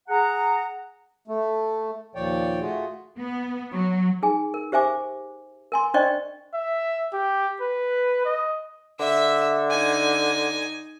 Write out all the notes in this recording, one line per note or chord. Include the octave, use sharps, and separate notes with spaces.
G#4 F#5 A#5
A3
D#2 A#2 F3 C#5 D5 G5
A3 F4 F#4 G#4
B3
F#3
D#4 G#4 G#5
A#4
G4 C5 E5 G#5 D6
A#4 G#5 C6
D4 C5 D5 D#5 G5 C#6
E5
G4
B4
D#5
D3 E5 E6
D#4 G#5